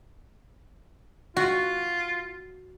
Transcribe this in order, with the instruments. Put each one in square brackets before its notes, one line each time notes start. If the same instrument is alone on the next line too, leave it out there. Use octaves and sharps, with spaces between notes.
[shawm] F4 [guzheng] F#4